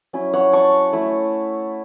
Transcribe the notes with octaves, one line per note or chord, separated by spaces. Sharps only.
F#3 C#4 E4
C#5 F#5
A5 C#6
A3 E4